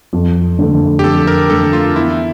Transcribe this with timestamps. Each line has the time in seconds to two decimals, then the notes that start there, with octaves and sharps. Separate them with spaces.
0.13 F2
0.59 D3 A3
0.99 G4
1.04 F2 A4
1.27 A#4
1.50 D3 A3 A4
1.73 F4
1.96 E2 E4